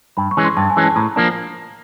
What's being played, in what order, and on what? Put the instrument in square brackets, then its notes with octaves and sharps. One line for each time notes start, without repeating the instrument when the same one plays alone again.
[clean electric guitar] G2 [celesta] B5
[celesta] C#6
[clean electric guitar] E3 G#3 C#4
[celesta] C6
[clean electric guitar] G2 [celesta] A5
[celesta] G#5
[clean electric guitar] E3 G#3 C#4
[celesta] A5
[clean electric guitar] A2 [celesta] A#5
[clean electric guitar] F3 A#3 D4